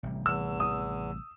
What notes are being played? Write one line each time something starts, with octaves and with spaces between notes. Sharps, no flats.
A1 C3 G3
E2 E6
D#6